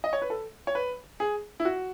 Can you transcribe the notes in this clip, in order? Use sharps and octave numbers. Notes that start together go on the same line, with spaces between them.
D#5
C#5
B4
A4
C#5
B4
G#4
E4
F#4